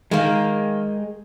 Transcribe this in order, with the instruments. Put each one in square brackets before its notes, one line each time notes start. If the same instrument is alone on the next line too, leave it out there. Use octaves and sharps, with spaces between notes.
[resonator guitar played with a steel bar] D#3 A#3 [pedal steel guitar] G#3 G5 [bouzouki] G#4 A#4